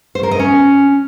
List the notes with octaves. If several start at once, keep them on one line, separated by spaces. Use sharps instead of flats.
C5
A#4
D#5
C#4